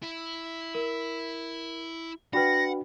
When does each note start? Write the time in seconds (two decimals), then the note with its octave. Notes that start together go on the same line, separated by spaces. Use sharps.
0.02 E4
0.75 A#4
2.33 D4 F#4 B4 F#5 G5 B5 A#6